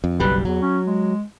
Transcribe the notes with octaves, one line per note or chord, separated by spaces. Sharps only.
F2
F#1 B1 G3 B4
E2 F#3
C#4
G#3